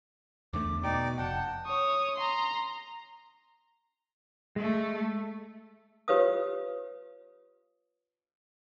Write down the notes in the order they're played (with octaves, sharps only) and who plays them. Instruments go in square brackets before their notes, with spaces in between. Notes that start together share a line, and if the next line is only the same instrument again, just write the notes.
[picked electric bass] E2 D3 A3 [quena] D6
[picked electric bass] B2 [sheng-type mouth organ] D#4 D5 D6 [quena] G5
[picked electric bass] F1 [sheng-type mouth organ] F#5 G5 [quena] A5
[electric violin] C#5 D#6
A#5 C6
[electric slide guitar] G#3 [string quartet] A3
[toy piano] F4 G4 B4 C#5 F5 D#6